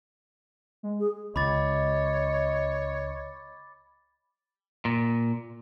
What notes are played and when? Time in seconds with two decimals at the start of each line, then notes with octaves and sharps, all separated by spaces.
0.83 G#3
0.99 G#4
1.36 C#2 C#5 D#5 B5 D6 A6
4.85 A#2